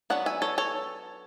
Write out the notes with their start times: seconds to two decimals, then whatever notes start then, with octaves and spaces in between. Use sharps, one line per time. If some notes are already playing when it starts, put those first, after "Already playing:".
0.10 F#3 B3 D4 F#5
0.26 E5 G#5
0.42 A4 C#5
0.58 A4 C#5